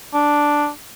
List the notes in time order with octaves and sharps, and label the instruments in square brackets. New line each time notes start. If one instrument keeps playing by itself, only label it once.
[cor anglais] D4